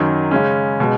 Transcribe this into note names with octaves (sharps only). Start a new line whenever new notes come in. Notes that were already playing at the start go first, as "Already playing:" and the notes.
Already playing: F#2 D#3 F#3
C#3 G#3 C#4
B2 G#3